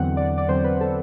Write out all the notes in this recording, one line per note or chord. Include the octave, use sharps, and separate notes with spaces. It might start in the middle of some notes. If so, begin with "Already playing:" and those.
Already playing: E2 D3 F#3 C4 F#5
D5
D5
E2 D3 F#3 C4 C5
B4
A4